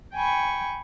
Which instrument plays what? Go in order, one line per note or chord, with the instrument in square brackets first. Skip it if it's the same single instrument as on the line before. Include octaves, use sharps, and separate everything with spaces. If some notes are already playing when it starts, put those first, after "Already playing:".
[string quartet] G5 G#5 B5 C#6